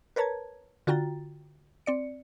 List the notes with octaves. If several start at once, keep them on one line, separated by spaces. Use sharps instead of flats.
A#4 B4 C#5 A5 A#5 G#6
D3 F4 F#4 G5 A#5 A6
C4 D5 C#7